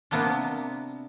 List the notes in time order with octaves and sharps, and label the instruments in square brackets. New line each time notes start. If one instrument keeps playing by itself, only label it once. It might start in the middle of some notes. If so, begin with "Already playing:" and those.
[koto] C3 A#3 B3 D4